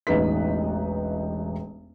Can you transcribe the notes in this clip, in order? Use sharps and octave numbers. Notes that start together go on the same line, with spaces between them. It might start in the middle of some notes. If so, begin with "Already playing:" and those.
E1 A1 D#4 B4 B6